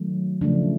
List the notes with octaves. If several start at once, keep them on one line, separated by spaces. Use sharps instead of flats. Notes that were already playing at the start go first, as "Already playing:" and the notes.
Already playing: D#3 F#3 A3
C#3 F3 A3 D4